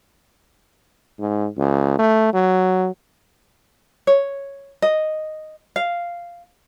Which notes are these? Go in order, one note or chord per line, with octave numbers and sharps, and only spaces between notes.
G#2
C#2
A3
F#3
C#5
D#5
F5